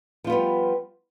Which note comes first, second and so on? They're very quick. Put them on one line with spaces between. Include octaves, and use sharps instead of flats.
F3 F4 B3 G3